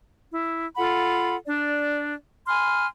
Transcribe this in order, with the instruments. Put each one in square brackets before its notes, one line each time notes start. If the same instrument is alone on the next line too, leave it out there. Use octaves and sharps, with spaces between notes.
[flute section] E4
F4 A4 F#5 B5
D4 D5
G#5 B5 C6 F6